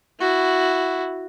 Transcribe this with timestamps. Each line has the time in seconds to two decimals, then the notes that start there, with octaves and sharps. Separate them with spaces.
0.20 E4 F#4